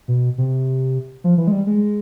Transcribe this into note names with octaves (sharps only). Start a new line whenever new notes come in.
B2
C3
F3
E3
G#3
G3
G#3